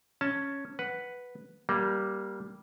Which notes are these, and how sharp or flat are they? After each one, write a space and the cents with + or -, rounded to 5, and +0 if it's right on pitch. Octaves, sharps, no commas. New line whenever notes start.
C#4 +0 A5 +15
B4 +0 F#5 +0
G3 -10 A#3 +10